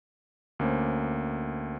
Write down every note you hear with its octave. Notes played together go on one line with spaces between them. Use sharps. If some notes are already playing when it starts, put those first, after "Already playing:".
D2 A#3 C#4 C5